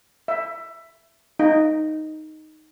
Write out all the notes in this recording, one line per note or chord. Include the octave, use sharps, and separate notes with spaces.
E5
D#4